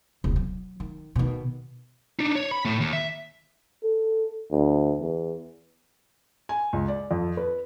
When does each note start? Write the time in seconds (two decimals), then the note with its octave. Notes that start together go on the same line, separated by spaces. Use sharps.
0.24 E1 C#2
0.36 F#3
0.80 D#3
1.16 B2 D#3
2.19 D4 D#4
2.35 C#5
2.51 B5
2.65 A2 A3
2.81 D#2
2.93 E5
3.83 A4
4.51 D2
5.01 E2
6.49 G#5
6.73 C#2
6.88 D5
7.11 F2
7.37 B4